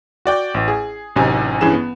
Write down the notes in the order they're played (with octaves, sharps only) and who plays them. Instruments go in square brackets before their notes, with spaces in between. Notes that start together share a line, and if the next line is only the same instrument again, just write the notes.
[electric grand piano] F#4 D5 G5
A1
G#4
A1 F#2 C3 D#4 G#5
G2 E3 C#4 G#4 E7
B3